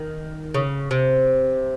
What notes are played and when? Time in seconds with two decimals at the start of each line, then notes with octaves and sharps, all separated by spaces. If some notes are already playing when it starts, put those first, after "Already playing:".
Already playing: D#3
0.54 C#3
0.91 C3